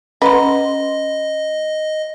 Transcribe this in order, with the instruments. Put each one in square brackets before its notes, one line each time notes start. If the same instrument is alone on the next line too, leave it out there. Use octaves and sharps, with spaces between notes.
[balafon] C#4 F#5 C6 [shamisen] B4 [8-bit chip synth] D#5